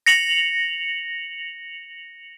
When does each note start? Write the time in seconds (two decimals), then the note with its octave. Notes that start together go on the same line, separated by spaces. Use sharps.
0.06 A#6 C#7 F7 F#7